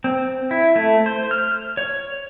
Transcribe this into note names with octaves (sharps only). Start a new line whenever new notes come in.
C4
E4
A3
C5
F6
C#5